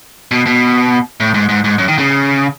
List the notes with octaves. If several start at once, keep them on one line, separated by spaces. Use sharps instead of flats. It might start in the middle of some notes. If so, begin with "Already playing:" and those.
B2
B2
A2
G#2
G#2
G#2
F#2
D#3
C#3